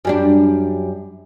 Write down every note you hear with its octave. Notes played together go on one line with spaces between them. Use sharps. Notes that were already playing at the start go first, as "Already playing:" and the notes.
F#2 G3 D4